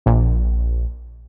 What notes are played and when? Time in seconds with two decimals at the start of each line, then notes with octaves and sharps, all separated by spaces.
0.06 A#1